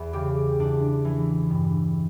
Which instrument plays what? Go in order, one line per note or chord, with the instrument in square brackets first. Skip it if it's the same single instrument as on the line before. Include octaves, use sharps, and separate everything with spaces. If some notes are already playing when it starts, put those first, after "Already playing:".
Already playing: [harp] E2
C#3 G4
E2 D4
E3
G2